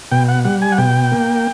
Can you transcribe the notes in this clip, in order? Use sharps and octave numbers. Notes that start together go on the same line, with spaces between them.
B2 G5
F#5
G3 F#5
G#5
F#5
B2 G5
A#3